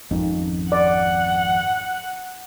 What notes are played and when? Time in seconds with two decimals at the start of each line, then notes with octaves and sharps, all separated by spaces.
0.11 G#1 F2 C#4 D#4
0.72 D5 F#5